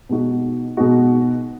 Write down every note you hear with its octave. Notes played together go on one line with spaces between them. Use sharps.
B2 G#3 D#4 F#4
B2 G#3 D#4 F#4